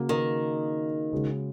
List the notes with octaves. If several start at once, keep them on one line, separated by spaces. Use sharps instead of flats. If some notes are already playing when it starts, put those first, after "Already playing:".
Already playing: C#3 A#3 F#4
D#3
C#3 G#3 C#4 F#4